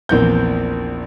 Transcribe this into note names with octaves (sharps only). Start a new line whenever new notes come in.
A#1 E2 A#3 C4 G6